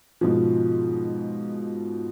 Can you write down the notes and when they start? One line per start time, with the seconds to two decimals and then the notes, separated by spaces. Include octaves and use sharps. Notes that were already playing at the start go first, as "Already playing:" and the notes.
0.21 G#2 B2 F3